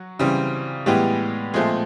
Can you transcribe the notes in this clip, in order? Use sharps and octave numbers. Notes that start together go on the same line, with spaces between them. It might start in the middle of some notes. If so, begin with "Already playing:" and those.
Already playing: F#3 F#4
C#3 E3 G3 C4
A2 E3 G3 G#3 B3 G4
A#2 F3 G#3 A3 C4 G#4